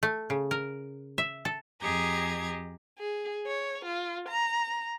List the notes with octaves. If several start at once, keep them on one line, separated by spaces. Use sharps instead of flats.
A3
C#3
A#4
E5
A4
F2 G4 G#4 D#5 A#5 G#6
G#4
C#5
F4
A#5